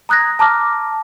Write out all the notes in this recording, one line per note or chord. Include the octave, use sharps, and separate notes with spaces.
A#5 D#6 F#6 G#6 A#6
A5 A#5 D6 F6 A#6